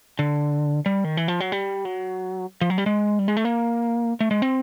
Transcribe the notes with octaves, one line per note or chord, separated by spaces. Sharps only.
D3
G3
D#3
E3
F3
F#3
G3
F#3
F3
F#3
G3
G#3
G3
G#3
A3
A#3
A3
G#3
C4